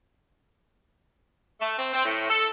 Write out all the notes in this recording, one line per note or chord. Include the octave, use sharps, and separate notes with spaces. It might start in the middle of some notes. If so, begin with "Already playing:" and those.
A3
C4
C4
A2
A4